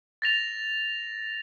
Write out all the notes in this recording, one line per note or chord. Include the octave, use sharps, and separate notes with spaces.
A6 A#6 F7